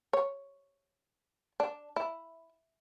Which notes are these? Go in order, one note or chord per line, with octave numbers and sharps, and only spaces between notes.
C#5
D4
E4